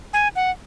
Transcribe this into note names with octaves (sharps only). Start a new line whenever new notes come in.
G#5
F#5